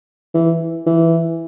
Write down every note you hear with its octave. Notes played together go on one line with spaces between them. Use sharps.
E3
E3